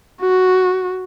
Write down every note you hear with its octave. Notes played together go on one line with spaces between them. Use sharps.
F#4